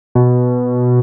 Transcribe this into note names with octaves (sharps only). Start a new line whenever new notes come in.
B2